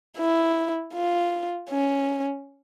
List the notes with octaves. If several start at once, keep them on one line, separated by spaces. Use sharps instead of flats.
E4
F4
C#4